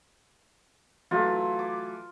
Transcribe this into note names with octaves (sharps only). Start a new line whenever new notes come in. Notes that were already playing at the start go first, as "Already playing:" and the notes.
E3 F#3 A3 F4
D6